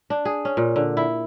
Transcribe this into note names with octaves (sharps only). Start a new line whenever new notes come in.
D4
G#4
C#4
A#2
D3
E4